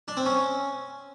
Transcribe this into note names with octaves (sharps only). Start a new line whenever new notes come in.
D4
C4
C#4